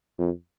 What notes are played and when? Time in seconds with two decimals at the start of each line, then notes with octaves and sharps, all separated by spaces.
0.18 F2